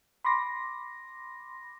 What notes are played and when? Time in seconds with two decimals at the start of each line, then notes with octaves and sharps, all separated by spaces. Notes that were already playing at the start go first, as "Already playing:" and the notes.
0.25 B5 C6 D6 A#6